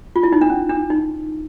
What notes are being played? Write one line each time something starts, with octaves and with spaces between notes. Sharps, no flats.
F4
E4
D#4
D4
C#4
D4
D#4